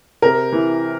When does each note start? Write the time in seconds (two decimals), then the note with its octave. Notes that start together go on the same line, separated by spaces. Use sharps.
0.22 C3 A#4
0.52 E3